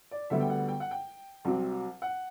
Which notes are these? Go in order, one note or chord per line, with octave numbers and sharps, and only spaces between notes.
D5
D2 D3 G3 B3 E5
G5
F#5
G5
F#5
G5
C2 C3 F#3 C4
F#5